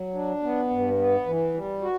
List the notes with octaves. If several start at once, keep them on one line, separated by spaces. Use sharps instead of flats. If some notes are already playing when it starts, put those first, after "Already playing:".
Already playing: F#3
D4
B3
G2
B3
E3
G3
F#4